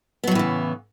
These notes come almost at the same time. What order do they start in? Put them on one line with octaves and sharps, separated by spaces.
B3 F#3 A2 E3 C#3